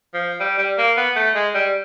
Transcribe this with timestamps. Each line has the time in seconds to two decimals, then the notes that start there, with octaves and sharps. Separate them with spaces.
0.14 F3
0.40 G3
0.58 G3
0.78 A#3
0.97 B3
1.16 A3
1.34 G#3
1.54 G3